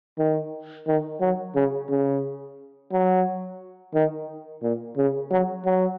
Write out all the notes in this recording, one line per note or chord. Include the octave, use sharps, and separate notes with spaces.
D#3
D#3
F#3
C#3
C#3
F#3
D#3
A#2
C#3
F#3
F#3